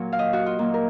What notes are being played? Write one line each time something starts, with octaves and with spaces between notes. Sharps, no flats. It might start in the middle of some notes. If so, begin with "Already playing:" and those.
Already playing: A#2 F#3
F5
D#5
F#4
F4
A#2 F#3 A#3
A#4